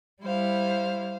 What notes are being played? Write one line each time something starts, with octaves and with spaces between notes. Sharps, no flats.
G3 E4 C5 F5